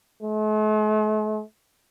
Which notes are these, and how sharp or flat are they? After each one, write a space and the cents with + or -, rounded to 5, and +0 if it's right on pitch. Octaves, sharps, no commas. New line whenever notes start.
A3 -45